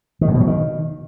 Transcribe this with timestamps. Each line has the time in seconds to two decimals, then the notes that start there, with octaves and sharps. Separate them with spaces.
0.21 D#3
0.28 G#2
0.34 B2
0.41 F#3
0.47 D#3